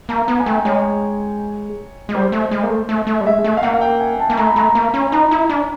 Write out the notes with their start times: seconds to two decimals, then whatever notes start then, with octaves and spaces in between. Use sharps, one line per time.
0.09 A#3 A#5
0.28 B3
0.39 G#5
0.46 A3 G5
0.65 G#3 C#5
2.09 G#3
2.14 G3 C5
2.32 A3
2.51 G#3
2.63 A#3
2.69 A3
2.89 A3
3.07 A3
3.21 G3
3.25 G#3 E5
3.44 A3
3.57 F5
3.63 A#3 F#5
3.73 F#5
3.81 G5
4.00 G#5
4.19 A5
4.30 A#3
4.37 A3 A#5
4.48 B5
4.56 A3 A#5
4.75 A#3
4.94 C#4
5.12 D#4 A#5
5.31 E4 B5
5.49 D4 A#5